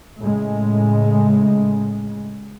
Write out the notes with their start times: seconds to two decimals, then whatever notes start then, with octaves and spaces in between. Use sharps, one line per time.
0.20 A2 C#3 G#3